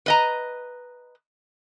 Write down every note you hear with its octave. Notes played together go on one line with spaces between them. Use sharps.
B4 D#5 A#5